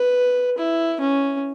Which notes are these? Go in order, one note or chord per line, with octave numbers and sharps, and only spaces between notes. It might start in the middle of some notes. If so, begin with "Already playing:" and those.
Already playing: B4
E4
C#4